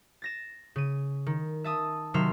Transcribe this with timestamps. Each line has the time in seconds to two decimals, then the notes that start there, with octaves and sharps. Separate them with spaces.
0.22 A6 A#6 E7
0.76 C#3 D#7
1.26 D#3
1.64 E5 A5 D#6
2.14 C3 D#3 F#3 E5 C6 F6